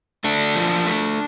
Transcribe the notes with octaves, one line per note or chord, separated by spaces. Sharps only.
A3 D4
F3
A3